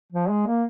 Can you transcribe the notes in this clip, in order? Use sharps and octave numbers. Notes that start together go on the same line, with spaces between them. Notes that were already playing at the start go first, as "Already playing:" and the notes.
F3
G#3
A#3